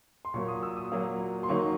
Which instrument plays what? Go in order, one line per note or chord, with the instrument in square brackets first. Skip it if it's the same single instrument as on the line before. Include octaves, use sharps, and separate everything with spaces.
[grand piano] C6
A#2 F#3 A#3 C#6
D#6
E6
D#6
A#2 F#3 A#3
C6
D#3 F#3 A#3 D#4 C#6